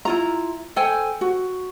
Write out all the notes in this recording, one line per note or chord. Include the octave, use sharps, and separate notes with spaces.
E4 F4 A#5
A4 C5 G5 G#5
F#4